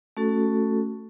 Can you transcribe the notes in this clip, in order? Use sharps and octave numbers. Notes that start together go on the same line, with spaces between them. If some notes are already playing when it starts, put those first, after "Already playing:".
A3 C#4 F#4 A4